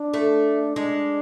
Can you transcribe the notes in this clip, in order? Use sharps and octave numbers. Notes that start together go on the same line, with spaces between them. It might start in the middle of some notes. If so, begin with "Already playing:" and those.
Already playing: D4
A3
G#3 D4